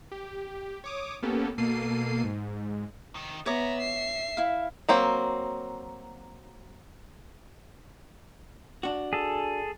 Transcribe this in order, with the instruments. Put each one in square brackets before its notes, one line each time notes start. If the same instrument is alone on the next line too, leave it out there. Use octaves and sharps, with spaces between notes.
[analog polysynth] G4
C#5 D6 D#6
A#3 B3 C#4 G4 A4
B2 A#3 A4 C7 D#7
G#2
[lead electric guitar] C3 D#3
[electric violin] B3 A#5 [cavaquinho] C#5 D6 [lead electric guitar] E5
[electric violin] C7
[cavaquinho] E4 F5
[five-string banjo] F#3 A#3 C4
[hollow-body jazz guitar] D4 F#4
[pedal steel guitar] G#4 A4